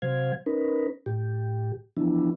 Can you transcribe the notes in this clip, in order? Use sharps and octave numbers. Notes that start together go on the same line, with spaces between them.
C3 F#3 C5 F5 G#6
C#4 D#4 A#4 B4
A2 G4
E3 F3 B3 D4 E4